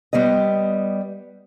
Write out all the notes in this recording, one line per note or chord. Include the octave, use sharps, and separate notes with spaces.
G3 B3 G4 D#5